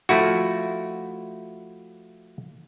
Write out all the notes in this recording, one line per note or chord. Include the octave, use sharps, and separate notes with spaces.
F3 A3 E4 F#4